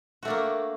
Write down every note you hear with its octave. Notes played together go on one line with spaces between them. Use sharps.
A3 A#3 D4 F#4